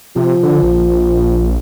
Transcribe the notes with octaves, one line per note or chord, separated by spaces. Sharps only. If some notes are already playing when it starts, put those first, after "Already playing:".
C3 F3
D3
A#1